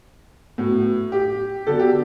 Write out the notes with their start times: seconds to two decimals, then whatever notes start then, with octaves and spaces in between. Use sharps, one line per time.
0.58 A2 F#3 B3
1.12 G4
1.67 D3 F#3 B3 A4
1.79 G4